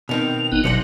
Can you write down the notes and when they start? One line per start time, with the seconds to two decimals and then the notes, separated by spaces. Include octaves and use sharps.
0.09 B2 D#3 C4 F7
0.52 G#1 B3 D#4 F#6
0.64 G1 D2 B2 F#3 C5 F#5 C#7